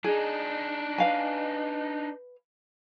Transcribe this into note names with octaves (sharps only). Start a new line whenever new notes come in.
D4 D#4 G#4
B4 F5 G#5